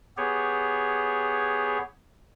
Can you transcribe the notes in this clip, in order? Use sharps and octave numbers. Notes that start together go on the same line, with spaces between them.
B3 G4 G#4 C#5